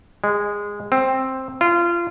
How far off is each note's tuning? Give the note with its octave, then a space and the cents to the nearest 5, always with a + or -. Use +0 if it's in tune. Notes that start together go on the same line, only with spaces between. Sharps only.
G#3 -15
C4 +10
F4 -25